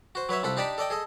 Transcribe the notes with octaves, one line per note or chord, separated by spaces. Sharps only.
F#4 C5
F#3 B4 C#5 E5
C2 F4 A4 F#5 B5
D4 D#4 G4 D5 A5 B5
A4 D5 D#5 G5
G#4 A4 D#5